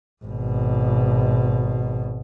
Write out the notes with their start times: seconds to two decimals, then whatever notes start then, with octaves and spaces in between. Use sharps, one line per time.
0.24 G#1 B2